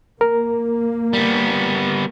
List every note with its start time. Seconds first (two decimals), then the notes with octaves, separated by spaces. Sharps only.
0.21 A#3 A#4
1.13 G3 B3